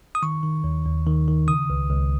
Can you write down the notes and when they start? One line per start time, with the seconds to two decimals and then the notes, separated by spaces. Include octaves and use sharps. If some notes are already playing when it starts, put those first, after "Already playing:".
0.15 D#6
0.23 D#3 C#6
0.43 D#3
0.64 D#2
0.85 D#2
1.07 D#3
1.28 D#3
1.48 C#3 D#6
1.70 C#2
1.90 C#2